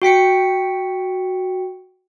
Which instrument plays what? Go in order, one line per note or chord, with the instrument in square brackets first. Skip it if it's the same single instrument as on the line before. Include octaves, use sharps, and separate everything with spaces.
[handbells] F#4 G5 B6 C#7